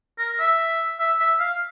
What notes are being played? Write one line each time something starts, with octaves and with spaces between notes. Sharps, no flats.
A#4
E5
E5
E5
F5